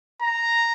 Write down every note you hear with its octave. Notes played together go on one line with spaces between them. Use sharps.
A#5